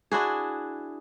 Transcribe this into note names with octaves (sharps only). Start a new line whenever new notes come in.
D4 E4 F#4 G#4